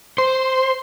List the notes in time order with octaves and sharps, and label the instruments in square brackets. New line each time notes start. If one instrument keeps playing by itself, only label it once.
[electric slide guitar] C5 [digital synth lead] C6